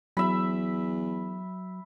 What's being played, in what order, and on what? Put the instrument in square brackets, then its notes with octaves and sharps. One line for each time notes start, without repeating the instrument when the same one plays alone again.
[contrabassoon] E2 [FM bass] F#3 [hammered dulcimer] E5 B5